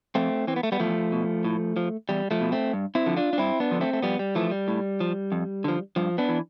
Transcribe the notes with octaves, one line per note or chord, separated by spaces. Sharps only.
F2 A3 C4
E3 C4
B3
A3
G3 B3
E2 F3 A3
B2
A2
F3
E2 G3
F3 A3
B2
A3 C4
G2
C4 E4
D3 F3
D4 F4
D4
G2 C4 E4
B3 D4
D3 F3
A3 C4
A3
F2 G3 B3
G3
E3 F3 A3
G3
A2
F3
F2
D3 F3
G2 F3
B3 D4
E3